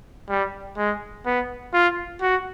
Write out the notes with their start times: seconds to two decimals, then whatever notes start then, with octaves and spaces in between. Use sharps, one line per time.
0.29 G3
0.77 G#3
1.26 B3
1.74 F4
2.22 F#4